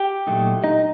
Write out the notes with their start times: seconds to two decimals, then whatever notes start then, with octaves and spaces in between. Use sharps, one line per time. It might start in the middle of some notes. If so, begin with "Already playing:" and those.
Already playing: G4 G5
0.27 A#2 F#3 A3 D#4
0.64 D#4 D#5